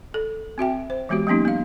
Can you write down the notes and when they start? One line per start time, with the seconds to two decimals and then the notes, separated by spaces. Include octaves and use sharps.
0.14 A4
0.58 C4 F#4 E5 G5
0.90 C5
1.09 E3 G#3 B3 F#4 G4
1.27 F#3 A#3 B3 C#4 D#4 G4
1.45 B3 F5